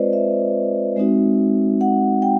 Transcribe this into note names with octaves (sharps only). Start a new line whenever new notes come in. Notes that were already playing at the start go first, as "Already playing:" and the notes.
Already playing: G#3 C4 F4 B4 C5 D5 D#5
E5
G#3 C4 D#4 F#4
F#5
G5